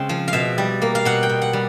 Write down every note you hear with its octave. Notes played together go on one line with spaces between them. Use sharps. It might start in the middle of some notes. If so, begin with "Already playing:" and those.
Already playing: C#3 G#3 C4
F3
F5
B2 E5
G3
A#3
F5
B2 F#5
G5
B2
F#5
G3